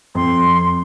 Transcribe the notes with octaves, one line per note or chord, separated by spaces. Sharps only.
F2 C6